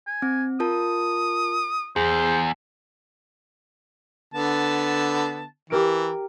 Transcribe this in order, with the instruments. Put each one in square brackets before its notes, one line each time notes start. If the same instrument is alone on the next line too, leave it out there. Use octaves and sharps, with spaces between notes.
[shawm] G#5
[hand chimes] C4
[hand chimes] F4 A#4 A5 [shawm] D#6
[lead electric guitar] E2 [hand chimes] G#4 [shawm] C5
[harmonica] D3 B3 A5
[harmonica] E3 [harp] G4 A#4 D7